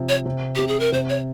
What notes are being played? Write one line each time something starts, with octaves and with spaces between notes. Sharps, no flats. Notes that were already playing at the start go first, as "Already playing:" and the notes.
Already playing: C3 F3
C#5
C3
C3 G4
G#4
A#4
C3 C5
C#5